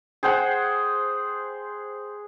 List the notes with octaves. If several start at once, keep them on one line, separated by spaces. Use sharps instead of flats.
G#4 C5 F#5 G5